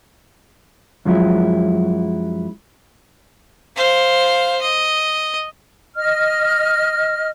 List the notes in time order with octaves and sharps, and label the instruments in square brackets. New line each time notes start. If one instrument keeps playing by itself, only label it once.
[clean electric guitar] F#2 F3 F#3 G#3 E4
[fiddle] C5 F5
D#5
[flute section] D#5 F6